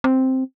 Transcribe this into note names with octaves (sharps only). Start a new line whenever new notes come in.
C4